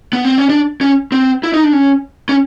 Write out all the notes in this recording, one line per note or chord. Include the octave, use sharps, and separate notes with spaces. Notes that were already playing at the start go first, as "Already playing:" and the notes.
B3
C4
C#4
D4
C#4
C4
E4
D#4
D4
C#4
C#4